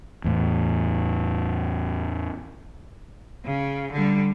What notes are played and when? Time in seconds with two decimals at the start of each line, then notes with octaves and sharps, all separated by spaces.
0.24 E2 A2
3.46 C#3
3.92 D3 G3